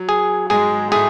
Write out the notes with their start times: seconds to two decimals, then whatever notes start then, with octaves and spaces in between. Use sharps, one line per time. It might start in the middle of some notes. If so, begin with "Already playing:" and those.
Already playing: F#3
0.09 G#4
0.50 G#2 G#3 G#4
0.92 A2 A3 G#4